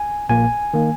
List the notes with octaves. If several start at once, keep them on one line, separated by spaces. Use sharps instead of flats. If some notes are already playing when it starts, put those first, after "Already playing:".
Already playing: G#5
A#1 A#2 A#3 G#5
D#3 A#3